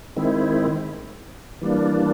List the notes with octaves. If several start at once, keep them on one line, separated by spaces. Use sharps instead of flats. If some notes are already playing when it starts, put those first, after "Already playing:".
D#3 G#3 C4 E4
E3 G3 A#3 D4